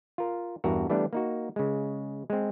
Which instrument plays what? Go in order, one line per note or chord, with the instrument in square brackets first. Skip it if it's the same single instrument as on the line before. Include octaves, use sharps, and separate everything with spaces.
[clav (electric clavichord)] F4 A#4
E2 G2 F#4 A#4
E3 G3 A3 B3 D4
A#3 D#4 F#4
C#3 G#3
G#3 C4